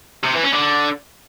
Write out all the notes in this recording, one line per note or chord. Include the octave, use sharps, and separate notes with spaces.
C3
E3
C#4
D3